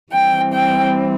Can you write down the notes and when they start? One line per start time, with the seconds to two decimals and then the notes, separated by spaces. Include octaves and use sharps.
0.11 E3 G3 C4 G5
0.52 G5